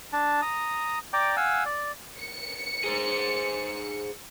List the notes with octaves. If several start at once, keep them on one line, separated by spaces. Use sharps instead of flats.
D4 A5
A#5 D#6
D5 G5 A#5 D6
F5 F#5 G#5 E6
D5
C#7
G#4 C5